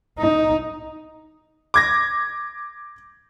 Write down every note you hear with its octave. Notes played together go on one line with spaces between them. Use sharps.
D#4
D6 G#6 A#6